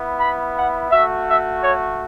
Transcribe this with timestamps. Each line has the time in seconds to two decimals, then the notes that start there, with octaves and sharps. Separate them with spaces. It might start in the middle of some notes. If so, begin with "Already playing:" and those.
Already playing: B3 E4
0.20 B5
0.56 F#5
0.91 A3 F#4 E5
1.27 E5
1.62 C#5